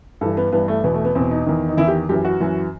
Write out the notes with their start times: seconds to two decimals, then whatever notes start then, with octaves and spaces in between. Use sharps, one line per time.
0.21 G2 E3 A4
0.37 B3
0.52 G2 E3 B3
0.68 A3
0.84 E2 B2 B3
0.94 A3
1.05 B3
1.15 E2 B2 C4
1.31 D#4
1.46 E2 D#3
1.69 D#4
1.77 E2 D#3 E4
1.88 G4
2.09 F#2 E3 G4
2.25 F#4
2.40 F#2 E3